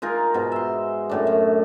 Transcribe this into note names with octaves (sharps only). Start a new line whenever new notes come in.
G#3 D#4 F4 A#4
G#2 B2
E5 C6
F#2 A2 D4
F#2